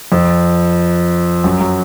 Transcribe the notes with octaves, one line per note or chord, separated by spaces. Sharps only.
F2 F3
F#2 F#3
F#3